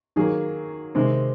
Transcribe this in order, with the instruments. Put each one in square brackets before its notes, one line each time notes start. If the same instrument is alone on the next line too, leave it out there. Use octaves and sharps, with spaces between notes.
[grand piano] D#3 F#3 A#3 G#4
C3 D#3 G#3 C4